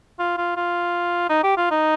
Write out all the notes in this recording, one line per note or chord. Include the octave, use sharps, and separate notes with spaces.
F4
F4
F4
D#4
G4
F4
D#4